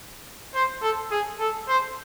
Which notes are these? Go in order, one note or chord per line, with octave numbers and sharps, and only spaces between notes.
C5
A4
G#4
A4
C5